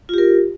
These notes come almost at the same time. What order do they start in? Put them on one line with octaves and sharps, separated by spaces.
F4 G4 A#4